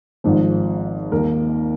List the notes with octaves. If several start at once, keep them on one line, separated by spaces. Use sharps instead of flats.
G#1 G#2 F3
D#2 D#3 A#4